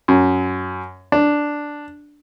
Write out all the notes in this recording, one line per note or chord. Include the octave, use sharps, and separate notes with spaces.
F#2
D4